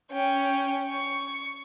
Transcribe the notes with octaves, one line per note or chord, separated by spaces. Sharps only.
C#4 G5
C#6